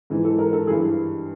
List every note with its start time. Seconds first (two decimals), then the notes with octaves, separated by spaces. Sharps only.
0.10 G#2 E3
0.24 A4
0.39 A#4
0.53 A4
0.67 G2 E3 G#4